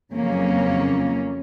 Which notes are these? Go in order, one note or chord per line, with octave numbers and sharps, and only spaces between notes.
F2 C#3 F#3 A#3 C#4